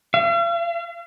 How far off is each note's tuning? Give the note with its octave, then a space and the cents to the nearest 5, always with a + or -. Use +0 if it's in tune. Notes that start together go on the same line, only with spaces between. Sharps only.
F5 -45